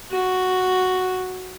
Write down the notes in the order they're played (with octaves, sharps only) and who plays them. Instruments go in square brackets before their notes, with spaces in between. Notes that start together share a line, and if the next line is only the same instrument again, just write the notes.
[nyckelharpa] F#4